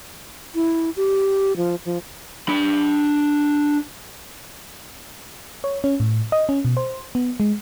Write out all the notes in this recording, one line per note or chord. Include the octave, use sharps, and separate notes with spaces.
E4
G4
F3
F3
D4 B5
C#5
C#4
A2
D#5
C#4
B2
C5
B3
G#3